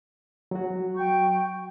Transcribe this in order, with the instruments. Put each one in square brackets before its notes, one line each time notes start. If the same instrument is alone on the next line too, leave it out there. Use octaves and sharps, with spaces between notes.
[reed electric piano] F#3 F#4
[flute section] G5 C#6 G6